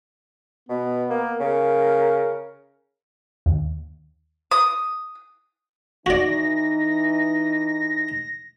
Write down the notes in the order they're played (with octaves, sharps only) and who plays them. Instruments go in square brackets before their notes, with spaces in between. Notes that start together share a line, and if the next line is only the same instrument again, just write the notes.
[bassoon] B2 [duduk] B3
[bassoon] A#3
[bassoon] C#3 [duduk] A#4
[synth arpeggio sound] D#2
[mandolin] D#6
[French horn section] E3 D#4 [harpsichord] F#4 D5 [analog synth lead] A#6